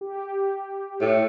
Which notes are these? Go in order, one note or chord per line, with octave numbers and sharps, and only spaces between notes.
G4
A2